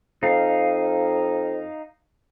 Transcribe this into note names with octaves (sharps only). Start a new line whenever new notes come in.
F2 D#4 F5